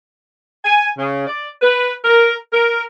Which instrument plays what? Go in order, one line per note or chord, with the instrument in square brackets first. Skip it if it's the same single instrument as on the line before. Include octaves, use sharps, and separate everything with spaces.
[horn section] G#5
C#3
D5
B4
A#4
A#4